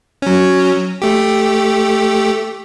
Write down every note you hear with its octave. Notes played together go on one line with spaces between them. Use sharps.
F#3 C#4
A3 G4